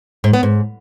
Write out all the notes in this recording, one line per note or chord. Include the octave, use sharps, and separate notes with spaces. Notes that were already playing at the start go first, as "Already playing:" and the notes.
G#2
B3
G#2